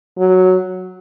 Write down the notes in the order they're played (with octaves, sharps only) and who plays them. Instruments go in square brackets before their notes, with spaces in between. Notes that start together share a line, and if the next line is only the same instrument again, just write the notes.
[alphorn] F#3